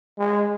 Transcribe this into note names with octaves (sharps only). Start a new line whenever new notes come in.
G#3